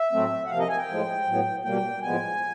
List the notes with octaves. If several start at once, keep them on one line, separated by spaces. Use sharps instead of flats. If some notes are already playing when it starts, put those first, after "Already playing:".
Already playing: E5
A2 F#3 A3 C4
F#5
C3 F3 A#3 F5
D#5
G#5
G5
A2 F3 G#3
A2 F#3 B3
B2 G3 A#3 G5
A2 F3 G#3 B3 G#5